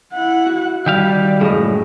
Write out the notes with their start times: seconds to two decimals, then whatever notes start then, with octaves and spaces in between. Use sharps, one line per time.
0.13 E4 F#5
0.46 F#4
0.86 D#3 G3 G4 F5
1.41 C#2 F#2 A2 G#4 D#5